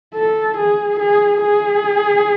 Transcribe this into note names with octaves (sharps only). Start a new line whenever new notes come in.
A4
G#4
G#4
G#4